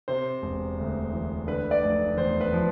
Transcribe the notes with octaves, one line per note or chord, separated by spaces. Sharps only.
C3 C5
E1
D2
E3
D3 B4
D5
F1
E2 C5
B4
F3